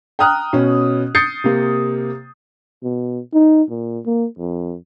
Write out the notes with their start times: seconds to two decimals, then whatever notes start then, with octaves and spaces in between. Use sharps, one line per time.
0.19 G5 A#5 D#6 F6 F#6
0.53 B2 C#4
1.15 D#6 G6 A6 C7 C#7
1.44 C3 A#3
2.83 B2
3.33 D#4
3.70 A#2
4.06 A#3
4.39 F2